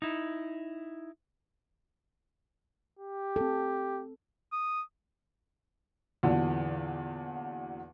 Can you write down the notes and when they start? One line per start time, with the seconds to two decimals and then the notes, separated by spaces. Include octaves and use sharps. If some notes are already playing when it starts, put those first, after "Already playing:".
0.02 D#4 E4
2.99 G4
3.36 C4 A4
4.52 D#6
6.23 E2 A#2 D3 E3 F#3